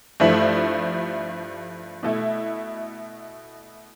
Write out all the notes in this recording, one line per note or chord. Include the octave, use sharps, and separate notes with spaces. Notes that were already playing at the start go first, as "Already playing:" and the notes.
G2 F3 A3 E4
B2 A3 E4